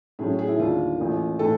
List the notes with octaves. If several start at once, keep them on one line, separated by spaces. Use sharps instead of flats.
A2 F#3 A3 C#4 G#4
G#4
E4
D#2 D3 G3 A#3 F4
A1 A2 F3 A#3
A2 E3 A3 A4